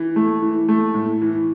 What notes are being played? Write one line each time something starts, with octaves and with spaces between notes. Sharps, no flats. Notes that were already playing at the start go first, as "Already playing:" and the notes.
Already playing: E3
A3
E3
A3
A2
E3